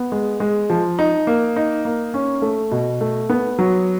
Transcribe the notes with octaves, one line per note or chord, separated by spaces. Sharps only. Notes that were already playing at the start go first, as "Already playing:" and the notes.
Already playing: B3
G#3
G#3
F3
D#4
A#3
D#4
A#3
C#4
A3
B2
A3
B3
F#3